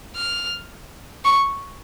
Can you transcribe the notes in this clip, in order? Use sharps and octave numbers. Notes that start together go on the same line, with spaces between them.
F6
C#6